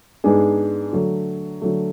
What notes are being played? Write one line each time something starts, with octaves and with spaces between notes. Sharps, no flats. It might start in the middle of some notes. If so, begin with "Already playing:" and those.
G#2 G#3 B3 D4 G#4
D3 F#3 A3
D3 F#3 A3